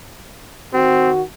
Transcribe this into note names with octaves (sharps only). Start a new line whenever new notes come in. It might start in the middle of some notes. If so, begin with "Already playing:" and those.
D#3 C4 F#4